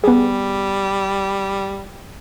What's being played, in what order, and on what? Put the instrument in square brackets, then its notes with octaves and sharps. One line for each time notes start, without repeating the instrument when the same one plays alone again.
[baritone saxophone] G3 [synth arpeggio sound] B3 G#4